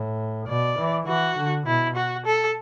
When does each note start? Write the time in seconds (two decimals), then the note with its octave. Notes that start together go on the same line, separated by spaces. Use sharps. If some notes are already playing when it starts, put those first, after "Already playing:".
Already playing: A2
0.48 B2 D5
0.78 E3
1.07 E3 F#4
1.38 D3
1.66 B2 E4
1.96 F#4
2.26 A4